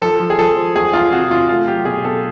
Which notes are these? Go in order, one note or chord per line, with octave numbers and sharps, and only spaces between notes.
F3 A4
F3
G#4
F3 A4
F3
E2 G#4
E2 F4
C3 F#4
E2 F4
A3 F4
F#3 G4
B2 G#4
B2 A4